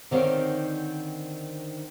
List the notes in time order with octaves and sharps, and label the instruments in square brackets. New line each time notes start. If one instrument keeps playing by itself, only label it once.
[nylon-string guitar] D3 D#3 C4 D#4 C#5 F5